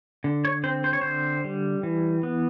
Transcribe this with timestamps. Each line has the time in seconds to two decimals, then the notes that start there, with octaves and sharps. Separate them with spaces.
0.24 D3
0.45 C#5
0.64 C4 C5
0.84 C5
0.93 C#5
1.01 D3 C5
1.44 G3
1.83 E3
2.23 B3